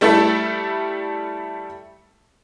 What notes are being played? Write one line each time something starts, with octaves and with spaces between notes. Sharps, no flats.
G3 A3 E4 A4